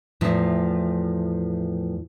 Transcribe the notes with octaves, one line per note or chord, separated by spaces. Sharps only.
E2 A2 F3